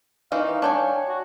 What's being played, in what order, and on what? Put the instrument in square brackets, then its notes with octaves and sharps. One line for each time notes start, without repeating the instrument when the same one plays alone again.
[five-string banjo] D#3 E3 D#4 [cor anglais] F5
[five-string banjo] D4 G5 G#5 [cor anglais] C#5
[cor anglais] F#4